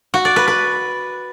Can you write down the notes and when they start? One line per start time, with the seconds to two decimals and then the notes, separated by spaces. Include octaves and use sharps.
0.14 F#4
0.25 D5
0.36 B4
0.48 B4